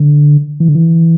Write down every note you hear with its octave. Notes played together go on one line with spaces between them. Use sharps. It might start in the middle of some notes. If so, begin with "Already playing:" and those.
Already playing: D3
E3
D3
E3